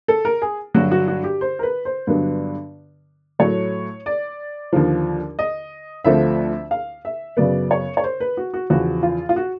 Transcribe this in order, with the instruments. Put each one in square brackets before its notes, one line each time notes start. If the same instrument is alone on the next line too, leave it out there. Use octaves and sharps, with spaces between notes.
[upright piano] A4
A#4
G#4
G2 D3 F#3 F#4
F#4
F#4
G4
C5
A#4
B4
C5
G2 D3 F#3 B3
A2 F#3 A3 C#5
D5
D#2 D3 F3
D#5
D2 D3 F3 A3 C4 E5
F5
E5
F#2 C#3 F#3 B3 D5
C#5
C#5
C5
B4
F#4
F#4
E2 C#3 F3 F#4
F4
F4
F#4